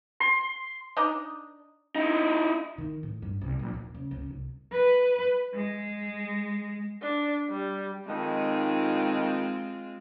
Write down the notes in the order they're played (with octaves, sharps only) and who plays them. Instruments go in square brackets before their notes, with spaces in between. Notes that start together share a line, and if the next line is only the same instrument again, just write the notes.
[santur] C6
[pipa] D4 D#4
[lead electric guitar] D#4 E4
[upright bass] D#3
A2
G2
C2
A#1
D#2
C#3
C#2
C2
[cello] B4
G#3
[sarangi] D4
G3
[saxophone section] F2 D#3 D#4 [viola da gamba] G#3 C4 F4